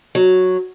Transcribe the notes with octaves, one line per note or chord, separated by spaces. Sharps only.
F#3